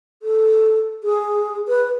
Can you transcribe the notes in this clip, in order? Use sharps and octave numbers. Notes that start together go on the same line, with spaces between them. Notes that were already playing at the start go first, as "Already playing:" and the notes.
A4
G#4
B4